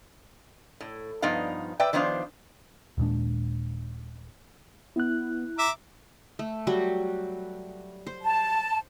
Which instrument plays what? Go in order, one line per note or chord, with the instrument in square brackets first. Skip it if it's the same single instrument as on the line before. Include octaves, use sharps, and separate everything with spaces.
[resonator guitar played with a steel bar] A2
G2 F3 B3 D#4 F5
B4 D5 E5 G5
D#3 F3 B3 D4 C5 F5
[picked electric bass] D#1 A#2 G#3 D4
[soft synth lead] B3 [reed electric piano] E4 F#6
[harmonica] E5 A#5 D6
[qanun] A3
F#3 G3 F#4
C5
[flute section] A5